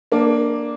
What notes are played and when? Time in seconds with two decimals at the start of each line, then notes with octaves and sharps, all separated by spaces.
0.12 A#3 D4